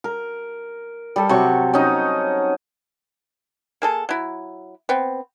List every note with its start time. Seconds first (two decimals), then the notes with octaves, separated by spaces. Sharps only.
0.04 A#4
1.16 G3 A4
1.29 C3 F#3 C#6
1.74 C#4 D#4
3.82 A#3 G#4 A4
4.09 F#3 E4
4.89 B3 C4